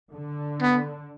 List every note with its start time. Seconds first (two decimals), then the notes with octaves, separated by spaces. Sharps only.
0.12 D3
0.62 B3